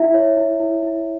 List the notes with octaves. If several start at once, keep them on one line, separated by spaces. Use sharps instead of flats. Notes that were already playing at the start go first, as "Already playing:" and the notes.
Already playing: E4 E5
C#5
E4
E4
E4